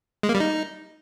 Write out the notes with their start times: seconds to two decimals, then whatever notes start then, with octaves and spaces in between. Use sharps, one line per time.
0.23 G#3
0.29 A#3
0.35 G3
0.40 D#4